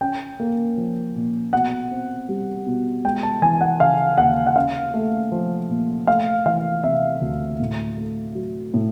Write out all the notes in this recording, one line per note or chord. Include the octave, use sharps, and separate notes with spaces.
C#4 G5
A#3
F3
A#2
B2 F#5
C4
G3
B2
G#3 G5
A5
E3 G#5
F#5
C#3 F5
D#2 F#5
F#5
C#4 F5
A3
F3
A#2
A3 F5
E3 F5
C3 E5
D2
A2
A3
F#3
A2